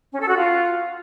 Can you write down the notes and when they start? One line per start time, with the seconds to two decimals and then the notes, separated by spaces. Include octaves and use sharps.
0.12 C#4
0.20 A4
0.28 F#4
0.36 F4